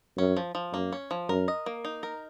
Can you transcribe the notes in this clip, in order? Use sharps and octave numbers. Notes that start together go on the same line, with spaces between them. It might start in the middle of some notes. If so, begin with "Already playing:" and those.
F#2 C#4
F3
F3
F#2 A#3
C#4
F3
F#2 A#4
D#5
A#3
D#4
A#4